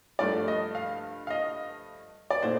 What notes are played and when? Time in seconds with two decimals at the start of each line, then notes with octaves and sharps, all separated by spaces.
0.19 G2 F3 A3 D5
0.48 D#5
0.75 F5
1.27 F5
1.30 D#5
2.30 D5
2.42 A#2 A3 D#4 C5